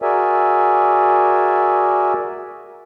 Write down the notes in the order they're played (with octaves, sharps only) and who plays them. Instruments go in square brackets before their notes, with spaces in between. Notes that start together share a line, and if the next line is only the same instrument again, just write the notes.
[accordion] F#4 G#4 A#4 D5 E5 G#5